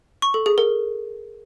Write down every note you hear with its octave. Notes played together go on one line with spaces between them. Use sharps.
C#6
A4
G#4
A#4